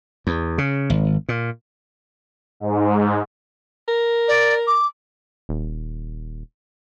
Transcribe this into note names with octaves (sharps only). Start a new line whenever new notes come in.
E2
C#3
G#1
A#2
G#2
A#4
D5
D6
D#1